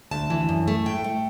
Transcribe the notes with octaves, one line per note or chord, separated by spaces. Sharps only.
D2 A5
E3
F#2
A3
A2 G5
A3